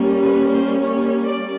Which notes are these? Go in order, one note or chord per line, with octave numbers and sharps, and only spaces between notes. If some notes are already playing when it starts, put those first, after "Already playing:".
Already playing: G3 A#3 C#4
B4
C5
C#5
D5